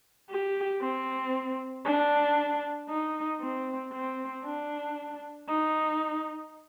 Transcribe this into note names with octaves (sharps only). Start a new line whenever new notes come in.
G4
C4
D4
D#4
C4
C4
D4
D#4